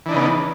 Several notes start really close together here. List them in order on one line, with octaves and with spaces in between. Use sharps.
E3 D4 D#4 C#3 B3